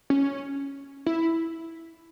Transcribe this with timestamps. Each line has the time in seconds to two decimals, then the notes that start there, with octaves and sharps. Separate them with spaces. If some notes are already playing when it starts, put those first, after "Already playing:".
0.10 C#4
1.06 E4